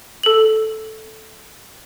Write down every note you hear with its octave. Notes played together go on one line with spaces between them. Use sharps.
A4 F#7